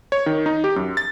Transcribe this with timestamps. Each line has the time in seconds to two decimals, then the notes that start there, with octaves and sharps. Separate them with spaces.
0.12 C#5
0.26 D#3
0.46 D#4
0.64 G4
0.76 F#2
0.97 A6